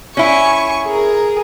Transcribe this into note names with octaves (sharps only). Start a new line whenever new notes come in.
C#4 E4 G#5 C#6
G#4 A#4